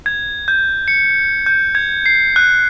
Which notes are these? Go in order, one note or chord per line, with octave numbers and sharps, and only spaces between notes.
G#6
G6
C#7
G6
G#6
C7
F#6